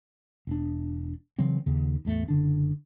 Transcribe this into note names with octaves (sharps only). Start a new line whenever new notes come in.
E1 D4
C#3 E3 F#3 C4
D#2 C#3
A1 E2 A3
F#1 D3 D4